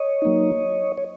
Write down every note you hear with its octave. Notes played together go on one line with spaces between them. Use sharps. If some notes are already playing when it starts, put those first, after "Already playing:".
Already playing: C#5 D#5
F#3 A#3 D#4
C#5